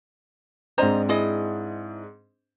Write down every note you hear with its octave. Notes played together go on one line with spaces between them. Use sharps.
G#2 C4 D4 C5 D#5 A#5
E4 G#4 D#5